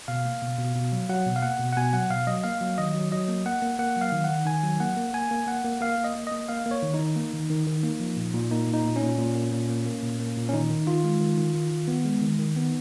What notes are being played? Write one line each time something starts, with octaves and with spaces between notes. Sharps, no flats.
B2 F5
A#3
B2
B2
B2
F#3
F#3 F#5
B2
F5
A#3 F#5
B2
F#5
B2 G#5
F#3 F#5
B2 F5
F#3 D#5
A#3 F5
F#3
D#3 D#5
F#3
F#3 D#5
A#3
A#3 F#5
A#3
A#3 F#5
F#3
F5
D#3
F#5
D#3
D#3 G#5
F#3
A#3 F#5
A#3
A#3 G#5
A#3
A#3 F#5
A#3
A#3 F5
A#3
D#5
A#3
A#3 D#5
A#3 F5
A#3
C#5
D#3
D#4
D#3
A#3
D#3
D#3
D#3
A#3
F3
A#2
A#2
A#3 D#4
A#2
D#4
A#2
C#4
A#2
A#2
A#3
A#2
A#3
A#3
A#2
A#3
A#2
C#4
D#3 D#4
D#3
D#3 F4
G#3
D#3
D#3
D#3
D#3
B3
G#3
D#3
D#3
B3